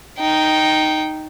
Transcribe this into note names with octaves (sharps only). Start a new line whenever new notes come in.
D#4 G5